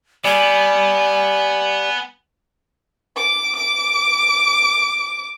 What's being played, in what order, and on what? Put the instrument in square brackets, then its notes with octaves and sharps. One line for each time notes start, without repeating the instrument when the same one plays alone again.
[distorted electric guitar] B3 [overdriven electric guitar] G4 D5 [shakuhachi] G#5
[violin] D6
D6